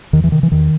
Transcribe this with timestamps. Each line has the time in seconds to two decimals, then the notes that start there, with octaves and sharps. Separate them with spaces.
0.13 E2 D#3
0.24 E3
0.32 C3 D#3
0.43 E3
0.52 E2 D#3